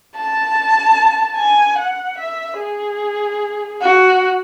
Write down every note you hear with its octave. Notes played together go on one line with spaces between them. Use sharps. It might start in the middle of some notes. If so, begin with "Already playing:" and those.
A5
G#5
F#5
E5
G#4
F#4